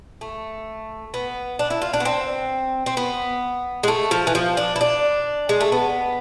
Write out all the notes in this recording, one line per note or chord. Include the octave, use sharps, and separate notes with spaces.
A3
B3
D4
E4
F4
D4
B3
C4
C4
B3
G#3
A3
F3
E3
F3
D4
E4
D4
G#3
A3
B3